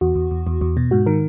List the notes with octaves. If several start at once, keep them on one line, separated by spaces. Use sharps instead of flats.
E2 F#4
E2
E2
E2
E2
B2
G#2 F#4
D#3 A#4